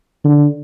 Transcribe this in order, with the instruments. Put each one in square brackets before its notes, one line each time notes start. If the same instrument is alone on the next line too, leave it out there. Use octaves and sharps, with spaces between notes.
[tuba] D3